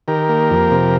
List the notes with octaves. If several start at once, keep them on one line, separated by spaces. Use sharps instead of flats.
D#3 G4 A#4
A#3
F2
C3